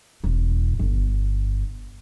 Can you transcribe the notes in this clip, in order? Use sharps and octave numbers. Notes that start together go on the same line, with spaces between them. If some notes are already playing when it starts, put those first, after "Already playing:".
E1
G1